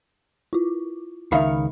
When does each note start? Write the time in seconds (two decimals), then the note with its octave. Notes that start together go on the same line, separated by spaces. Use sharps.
0.53 E4 F4
1.32 C#2 D#3 E5 F5 B5